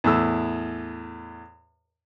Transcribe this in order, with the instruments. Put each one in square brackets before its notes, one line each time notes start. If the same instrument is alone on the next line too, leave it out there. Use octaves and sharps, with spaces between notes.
[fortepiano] E2 A2 E6